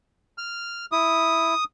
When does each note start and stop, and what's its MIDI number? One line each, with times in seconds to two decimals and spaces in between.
0.38 0.85 89
0.92 1.54 64
0.92 1.64 87